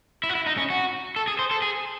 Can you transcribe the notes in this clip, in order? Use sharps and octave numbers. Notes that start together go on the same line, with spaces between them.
E4
F#4
E4
D#4
C#4
F#4
A4
G#4
C5
A4
G#4